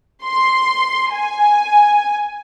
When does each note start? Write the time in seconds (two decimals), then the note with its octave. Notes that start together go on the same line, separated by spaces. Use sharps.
0.24 C6
1.12 G#5